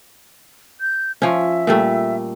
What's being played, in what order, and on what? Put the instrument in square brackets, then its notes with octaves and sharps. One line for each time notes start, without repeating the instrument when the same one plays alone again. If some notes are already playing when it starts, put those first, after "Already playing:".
[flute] G6
[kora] F3 C#4 [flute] E5
[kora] A#2 G3 A3